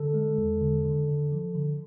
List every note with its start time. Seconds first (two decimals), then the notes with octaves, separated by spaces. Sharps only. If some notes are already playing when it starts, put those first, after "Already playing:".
Already playing: D3 A4
0.14 G#3
0.38 E2
0.61 D3
0.85 D3
1.08 D3
1.32 F3
1.55 D3